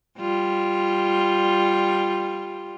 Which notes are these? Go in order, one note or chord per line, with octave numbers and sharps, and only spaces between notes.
G3 F4